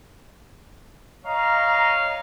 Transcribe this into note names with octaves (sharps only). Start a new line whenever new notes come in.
C#5 D#5 F5 A#5